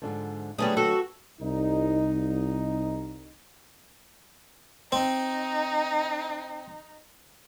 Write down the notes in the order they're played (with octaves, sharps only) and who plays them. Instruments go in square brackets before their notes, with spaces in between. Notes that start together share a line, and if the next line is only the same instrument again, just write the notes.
[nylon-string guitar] G#2 D3 F3
[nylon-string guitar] D3 F#3 A3 [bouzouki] G3 B3 G#4
[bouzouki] F#4 [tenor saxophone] A4
[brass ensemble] C2 D#4
[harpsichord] C4 [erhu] D#4